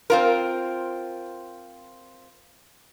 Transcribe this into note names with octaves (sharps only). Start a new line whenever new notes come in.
C4 F4 A#4